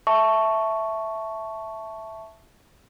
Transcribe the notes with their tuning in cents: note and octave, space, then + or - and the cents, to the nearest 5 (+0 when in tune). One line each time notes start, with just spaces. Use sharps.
E5 +0 A5 +0 C#6 +0